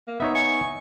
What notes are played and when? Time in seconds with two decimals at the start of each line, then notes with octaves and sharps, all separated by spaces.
0.07 A#3
0.20 B3 D#4 C#5 E5
0.35 G#5 C#6